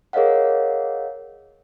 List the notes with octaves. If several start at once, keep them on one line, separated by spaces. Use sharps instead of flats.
G#4 A#4 C#5 D#5 F5 F#5